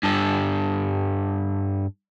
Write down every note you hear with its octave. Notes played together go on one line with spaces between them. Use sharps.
G2 A4